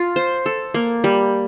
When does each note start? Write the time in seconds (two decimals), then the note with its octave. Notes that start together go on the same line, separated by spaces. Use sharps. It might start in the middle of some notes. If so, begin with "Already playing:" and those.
Already playing: F4
0.16 C5
0.46 A4
0.74 A#3
1.04 G3